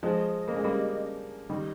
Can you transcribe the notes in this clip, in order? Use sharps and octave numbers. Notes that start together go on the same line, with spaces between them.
F3 G#3 D#5
A#3
G#3
G3 A#3
D#3 G3 D#5